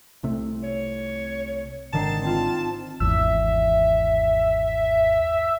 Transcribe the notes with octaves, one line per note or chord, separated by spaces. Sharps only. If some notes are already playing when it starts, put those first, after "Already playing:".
C2 C3 A3
C#5
G#1 D3 D#3 A5 C7
C4 F4
G#1 E2 E5